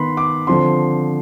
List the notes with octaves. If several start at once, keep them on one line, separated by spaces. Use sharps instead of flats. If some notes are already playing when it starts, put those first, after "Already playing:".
Already playing: D#3 B3 B5 C6
D6
D3 F3 C4 C6